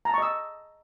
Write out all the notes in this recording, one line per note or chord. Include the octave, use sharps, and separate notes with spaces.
D#5 A5 A#5 C#6 E6